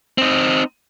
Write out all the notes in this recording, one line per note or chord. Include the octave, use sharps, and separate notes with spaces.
C4 D#4